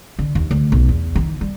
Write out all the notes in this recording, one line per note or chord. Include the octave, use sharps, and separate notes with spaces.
D3
D#2
D2
B1
E2
D#3
G3